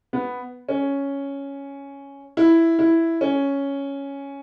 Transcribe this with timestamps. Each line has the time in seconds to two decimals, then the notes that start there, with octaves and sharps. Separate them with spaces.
0.13 B3
0.69 C#4
2.37 E4
2.79 E4
3.21 C#4